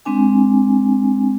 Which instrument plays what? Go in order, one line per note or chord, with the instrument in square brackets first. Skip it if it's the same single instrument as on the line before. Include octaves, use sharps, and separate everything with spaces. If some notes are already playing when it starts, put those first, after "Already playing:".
[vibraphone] G#3 C4 D4 G#5